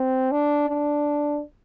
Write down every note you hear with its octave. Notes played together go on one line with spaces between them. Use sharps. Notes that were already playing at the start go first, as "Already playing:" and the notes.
Already playing: C4
D4
D4